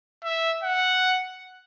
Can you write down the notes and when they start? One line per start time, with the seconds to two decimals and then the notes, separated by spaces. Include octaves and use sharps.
0.24 E5
0.63 F#5